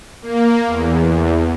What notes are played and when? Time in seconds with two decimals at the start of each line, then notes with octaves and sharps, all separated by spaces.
0.22 A#3
0.66 E2